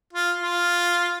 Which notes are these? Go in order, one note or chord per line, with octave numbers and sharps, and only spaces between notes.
F4
F4